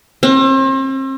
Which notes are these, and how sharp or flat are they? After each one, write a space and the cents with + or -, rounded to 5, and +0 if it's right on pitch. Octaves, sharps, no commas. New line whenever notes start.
C4 +40